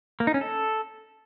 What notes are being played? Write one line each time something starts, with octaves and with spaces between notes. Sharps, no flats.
A#3
D#4
C#4
A4